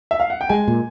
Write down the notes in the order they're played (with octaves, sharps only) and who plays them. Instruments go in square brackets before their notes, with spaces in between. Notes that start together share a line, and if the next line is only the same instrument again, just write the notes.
[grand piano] E5
F5
F#5
G5
[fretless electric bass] G#3 [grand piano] G#5
[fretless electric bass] A#2